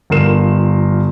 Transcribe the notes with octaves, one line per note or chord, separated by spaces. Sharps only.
G1 F4 A#4 C7 E7